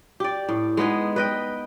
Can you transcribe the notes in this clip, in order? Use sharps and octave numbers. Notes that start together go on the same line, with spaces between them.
G4 D5
A2
G#3 B3 D#4 G#4
B4 D#5 G5